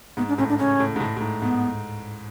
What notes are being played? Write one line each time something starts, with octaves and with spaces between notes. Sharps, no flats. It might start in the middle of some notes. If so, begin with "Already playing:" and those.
G#2 B3
D4
A2 C#4
D4
C#3 C#4
A2
G#2
A2
A2
G#2
G#2 B3